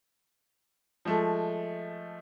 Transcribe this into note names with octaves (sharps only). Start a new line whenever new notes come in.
F3 G#3 A3